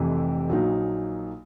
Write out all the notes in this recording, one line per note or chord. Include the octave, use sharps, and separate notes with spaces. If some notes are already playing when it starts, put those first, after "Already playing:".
Already playing: F1 F2 C3 E3
A#1 A#2 F#3 A#3 D#4